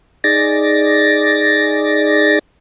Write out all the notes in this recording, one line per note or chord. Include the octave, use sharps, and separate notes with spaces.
D#4 G#4 D5 A6 A#6